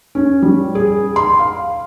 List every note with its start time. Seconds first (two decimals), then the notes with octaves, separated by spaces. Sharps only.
0.15 C#4
0.42 G3
0.75 G#4
1.16 C6
1.39 F5